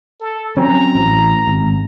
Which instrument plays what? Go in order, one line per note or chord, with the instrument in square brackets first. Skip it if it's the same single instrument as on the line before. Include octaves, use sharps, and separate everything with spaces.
[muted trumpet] A4
[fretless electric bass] F#3 C4 C#4 [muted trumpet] A#5
[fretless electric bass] A1
G#1